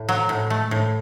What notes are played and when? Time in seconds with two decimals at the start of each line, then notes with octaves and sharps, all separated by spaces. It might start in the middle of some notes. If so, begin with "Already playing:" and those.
Already playing: A2
0.09 F#3
0.29 A2
0.50 A3
0.71 A2